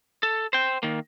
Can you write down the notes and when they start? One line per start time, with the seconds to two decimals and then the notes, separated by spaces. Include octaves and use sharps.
0.23 A4
0.53 C5 G5
0.83 D#3 A#3